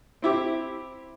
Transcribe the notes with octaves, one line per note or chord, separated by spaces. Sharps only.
C4 E4 G4